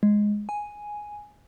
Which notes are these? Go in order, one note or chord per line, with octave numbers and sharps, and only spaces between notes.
G#3
G#5